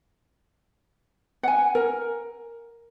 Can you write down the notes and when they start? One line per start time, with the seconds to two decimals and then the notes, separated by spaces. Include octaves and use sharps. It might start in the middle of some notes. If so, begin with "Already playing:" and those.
1.43 F#5 G#5
1.75 A#4